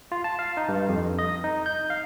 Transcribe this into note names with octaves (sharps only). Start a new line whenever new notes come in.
F4
A5
F5
D#4
G2
F2
D#5
D#4
G6
F5